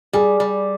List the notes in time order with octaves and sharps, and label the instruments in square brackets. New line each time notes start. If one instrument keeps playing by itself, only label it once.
[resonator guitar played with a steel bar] G3 [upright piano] G#4
[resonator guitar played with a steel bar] G3